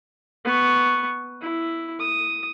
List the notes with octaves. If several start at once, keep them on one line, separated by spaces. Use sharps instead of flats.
B3 C#6
E4
D#6